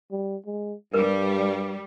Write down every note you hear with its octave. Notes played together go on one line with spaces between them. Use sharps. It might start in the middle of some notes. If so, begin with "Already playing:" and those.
G3
G#3
G2 G3 A#4 B4